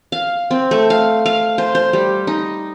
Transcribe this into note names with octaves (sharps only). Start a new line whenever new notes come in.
F5
C4
A3
F5
F5
C5
C5
G3
D#4